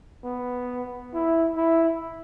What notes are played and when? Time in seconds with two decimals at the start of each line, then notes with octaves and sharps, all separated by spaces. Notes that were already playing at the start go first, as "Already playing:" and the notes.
0.24 B3
1.13 E4
1.56 E4